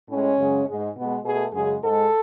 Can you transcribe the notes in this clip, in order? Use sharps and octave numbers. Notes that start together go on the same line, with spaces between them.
A2 G#3 C#4
F#2 C#3 G#3
G#2 G#3
B2 G#3 B3
B2 A3 G#4
F#2 C#3 G#3 G#4
G#2 G#3 A4